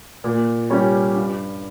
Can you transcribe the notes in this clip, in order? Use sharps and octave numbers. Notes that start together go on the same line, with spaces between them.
A#2
G3 C#4 G4
G2